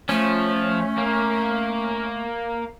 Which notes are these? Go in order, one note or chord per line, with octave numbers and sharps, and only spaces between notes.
F3 A3 C#4
A#3